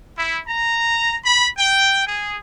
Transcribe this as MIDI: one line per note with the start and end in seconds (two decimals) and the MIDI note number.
0.17 0.38 64
0.47 1.15 82
1.24 1.47 83
1.57 2.02 79
2.05 2.34 68